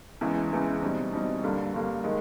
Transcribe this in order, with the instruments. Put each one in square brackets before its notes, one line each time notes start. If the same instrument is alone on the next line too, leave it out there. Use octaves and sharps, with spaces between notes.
[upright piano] E2 C#3 E3 G#3
E2 C#3 E3 G#3
B2 G3 C4 D#4
B2 G3 C4 D#4
G2 D3 G3 A#3
G2 D3 G3 A#3
D#3 G#3